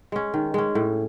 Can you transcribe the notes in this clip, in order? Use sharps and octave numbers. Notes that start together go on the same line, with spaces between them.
G#3 C#4
D#3
G#3 C#4
A2